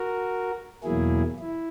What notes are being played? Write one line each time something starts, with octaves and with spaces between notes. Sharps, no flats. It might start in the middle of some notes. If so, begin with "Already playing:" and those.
Already playing: F#4 A#4
E2 B2 F#3 A#3 E4 G#4
E4